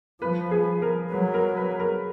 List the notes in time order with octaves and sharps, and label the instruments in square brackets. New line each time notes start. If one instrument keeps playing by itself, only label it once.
[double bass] F3 [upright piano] B4
[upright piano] G#4
A#4
[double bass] F#3 [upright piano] B4
[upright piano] A#4
B4
A#4